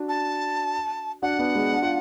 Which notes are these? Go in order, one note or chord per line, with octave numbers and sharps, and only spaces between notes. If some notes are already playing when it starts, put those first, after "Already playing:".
Already playing: D4 F#4
A5
D4 F#4 F#5
B3 D4
G#3 B3
D4
F4